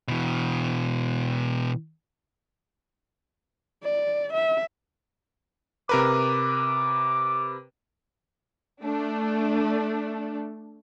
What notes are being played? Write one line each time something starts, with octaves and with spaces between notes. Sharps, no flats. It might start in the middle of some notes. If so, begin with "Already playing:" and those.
B2 E3
D5
E5
C3 A#4 B4 D6
A3 D4